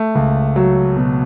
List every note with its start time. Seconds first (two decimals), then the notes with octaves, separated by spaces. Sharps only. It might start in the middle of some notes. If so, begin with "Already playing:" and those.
Already playing: A3
0.15 C#2
0.56 F#3
0.96 B2